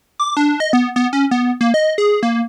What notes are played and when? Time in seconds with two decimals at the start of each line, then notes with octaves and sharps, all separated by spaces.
0.20 D6
0.37 D4
0.60 D#5
0.73 B3
0.96 B3
1.13 C#4
1.31 B3
1.61 A#3
1.74 D#5
1.98 G#4
2.23 A#3